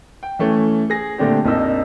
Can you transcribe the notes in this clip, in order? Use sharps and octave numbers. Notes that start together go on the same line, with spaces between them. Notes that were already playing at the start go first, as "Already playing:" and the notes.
G5
E3 A3 C#4
G#4 A#6
A#2 D3 A3 C4 D4 G4
A#1 F2 A#3 D4 D#4 E6